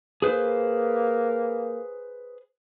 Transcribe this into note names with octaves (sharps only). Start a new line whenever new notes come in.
A#3 G#4 B4 C5